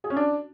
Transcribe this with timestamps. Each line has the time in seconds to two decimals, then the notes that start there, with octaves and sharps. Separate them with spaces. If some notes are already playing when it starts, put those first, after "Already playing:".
0.04 G#4
0.10 C#4
0.16 D4